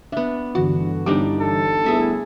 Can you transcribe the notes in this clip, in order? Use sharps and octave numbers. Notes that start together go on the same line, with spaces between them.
B3 D4 E5
G2 D3 E3 F#4
G1 G3 D4 D#4 G4 D6
A4
A3 B3 E4 G#4 E5 G#5